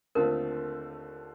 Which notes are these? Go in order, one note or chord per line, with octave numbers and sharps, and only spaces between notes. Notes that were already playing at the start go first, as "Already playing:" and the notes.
D#2 D3 A3 C4 F4 A#4